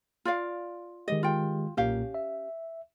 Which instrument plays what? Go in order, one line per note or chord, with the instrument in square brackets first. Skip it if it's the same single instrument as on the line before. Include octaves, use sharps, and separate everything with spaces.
[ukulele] F4 D5 F5
[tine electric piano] D#3 G#3 G4 [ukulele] D#5
[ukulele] F4 G5
[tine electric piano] B1 A#2 A#3 [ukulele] C#4 G4 F5
[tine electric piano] E5